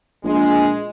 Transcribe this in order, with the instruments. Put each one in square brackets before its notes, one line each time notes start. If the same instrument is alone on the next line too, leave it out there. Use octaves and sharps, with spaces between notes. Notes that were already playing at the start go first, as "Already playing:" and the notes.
[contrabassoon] A#1 [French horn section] G#3